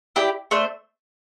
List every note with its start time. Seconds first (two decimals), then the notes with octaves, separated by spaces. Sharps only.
0.16 E4 G4 D5 G5
0.51 A3 D4 C5